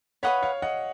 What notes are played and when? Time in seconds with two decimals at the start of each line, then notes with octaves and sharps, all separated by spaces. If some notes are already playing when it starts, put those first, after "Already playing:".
0.23 B4 C#5 D#5 F5 F#5 B5
0.42 C#5 F5
0.62 D#5 F#5